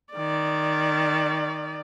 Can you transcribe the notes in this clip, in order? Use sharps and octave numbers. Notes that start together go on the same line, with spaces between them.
D#3 D5